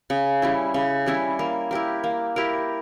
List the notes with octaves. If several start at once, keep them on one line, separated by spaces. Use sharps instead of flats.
C#3
G3 C#4 E4
C#3
G3 C#4 E4
A#3
E4 G4 A#4
A#3
E4 G4 A#4